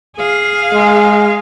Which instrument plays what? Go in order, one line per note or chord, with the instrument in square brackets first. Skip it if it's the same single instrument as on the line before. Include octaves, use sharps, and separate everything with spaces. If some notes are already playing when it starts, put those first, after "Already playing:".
[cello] G#4 F5
[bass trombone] G#3